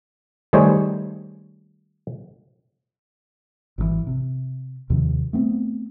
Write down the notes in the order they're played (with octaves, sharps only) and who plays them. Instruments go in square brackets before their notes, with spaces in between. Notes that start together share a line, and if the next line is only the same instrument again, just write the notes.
[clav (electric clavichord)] D#3 G3 A3 G#4 C5 C#5
[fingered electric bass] G#1 D3 E3
C3
D#2 C3 D#3 F3
A3 B3 C4